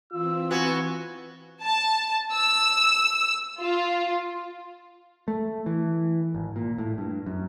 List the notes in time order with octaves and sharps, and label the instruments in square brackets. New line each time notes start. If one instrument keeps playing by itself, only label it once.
[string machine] E3 C4 [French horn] F4 [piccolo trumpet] E6
[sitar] B3 F#4 [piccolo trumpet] G#5
[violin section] A5
E6
F4
[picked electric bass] A3
E3
G#1
A#2
A2
G2
F#2